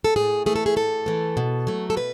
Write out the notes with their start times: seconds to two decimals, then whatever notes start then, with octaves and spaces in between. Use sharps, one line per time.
0.04 A4
0.16 A2 G#4
0.46 E3 A3 G#4
0.56 A4
0.66 G#4
0.76 A2 A4
1.06 E3 A3
1.37 B2
1.67 F#3 A3
1.90 A4
1.97 B2 B4